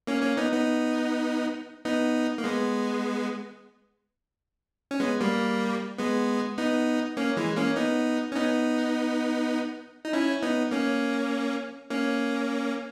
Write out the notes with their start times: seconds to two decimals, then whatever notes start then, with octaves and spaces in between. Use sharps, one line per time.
0.07 A#3 C#4
0.22 A#3 C#4
0.37 B3 D#4
0.52 B3 D#4
1.85 B3 D#4
2.38 A#3
2.44 G#3 B3
4.91 C#4
5.00 G#3 B3
5.20 G3 A#3
5.98 G#3 B3
6.58 B3 D#4
7.17 A#3 C#4
7.37 E3 G#3
7.56 A#3 C#4
7.76 B3 D#4
8.32 C#4
8.35 B3 D#4
10.05 D#4
10.13 C#4 E4
10.42 B3 D#4
10.71 A#3 C#4
11.90 A#3 C#4